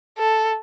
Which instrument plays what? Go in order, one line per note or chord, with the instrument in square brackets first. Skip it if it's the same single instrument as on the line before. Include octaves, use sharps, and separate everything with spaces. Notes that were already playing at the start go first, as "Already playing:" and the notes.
[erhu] A4